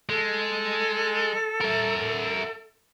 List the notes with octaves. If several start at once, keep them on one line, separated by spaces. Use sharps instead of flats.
G#3 A4
A#4 E5